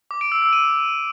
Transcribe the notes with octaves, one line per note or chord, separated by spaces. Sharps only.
D6
D7
E6
E6
D#7